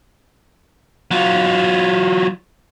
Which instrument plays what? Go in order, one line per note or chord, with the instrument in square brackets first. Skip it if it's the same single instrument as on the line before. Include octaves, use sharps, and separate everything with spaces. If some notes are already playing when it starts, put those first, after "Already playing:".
[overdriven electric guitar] F#3 F4